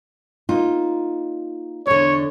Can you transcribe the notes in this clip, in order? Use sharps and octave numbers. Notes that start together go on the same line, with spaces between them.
A#3 D#4 F4
E2 D3 C#5